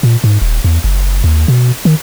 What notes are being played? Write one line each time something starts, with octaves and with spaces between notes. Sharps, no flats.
A#2
G#2
D#1
E2
F#1
D#2
B2
D#3